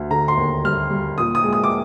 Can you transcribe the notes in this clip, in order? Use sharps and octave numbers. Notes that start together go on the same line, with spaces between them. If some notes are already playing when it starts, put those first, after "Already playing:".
Already playing: D2
D3 A#5
C6
D#2
G3 F6
G3
A#2 D#6
D#6
G#3
D#6
D6